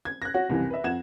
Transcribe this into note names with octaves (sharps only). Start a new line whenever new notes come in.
G#6
F#6 A#6
F#4 C#5 F#5
F#1 C2 C3 E3
B4 E5
F2 F#5 G#6 E7